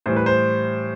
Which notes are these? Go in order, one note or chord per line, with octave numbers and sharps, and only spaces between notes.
A2 E3 G3 C5
B4
C5